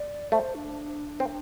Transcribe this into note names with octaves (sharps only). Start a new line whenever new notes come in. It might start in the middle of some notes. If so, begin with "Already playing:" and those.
Already playing: D5
A3 C5
D4
C4